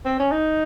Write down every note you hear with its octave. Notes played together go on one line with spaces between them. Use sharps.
C4
C#4
D#4